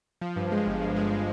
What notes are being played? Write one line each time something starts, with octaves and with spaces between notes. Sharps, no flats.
F3
G2
G#3
G1
G2
G#3